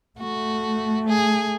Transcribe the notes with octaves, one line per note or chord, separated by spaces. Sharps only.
A3 F#4
G#4